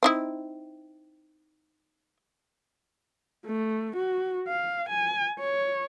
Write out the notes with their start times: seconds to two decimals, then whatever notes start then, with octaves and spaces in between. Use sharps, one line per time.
0.03 C4 D#4 E4
3.46 A3
3.97 F#4
4.48 F5
4.89 G#5
5.39 C#5